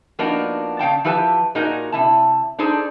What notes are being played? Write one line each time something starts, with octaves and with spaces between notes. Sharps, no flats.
F3 A#3 B3 D4 D#4 F#4
C#3 F5 G5 A5
F3 E4 G4 B4 G5 A5
A#2 D#4 F#4 G#4 A#4
C3 E4 A5
D4 D#4 G#4 A4 C5